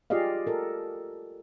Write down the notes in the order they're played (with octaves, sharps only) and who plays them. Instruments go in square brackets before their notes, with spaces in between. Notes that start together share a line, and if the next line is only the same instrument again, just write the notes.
[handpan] F4 G4 G#4 D5 D#5 F5
A4 A#4